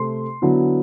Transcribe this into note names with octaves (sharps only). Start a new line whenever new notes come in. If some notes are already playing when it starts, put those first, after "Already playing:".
Already playing: C3 A3 C6
D3 F#3 B3 E4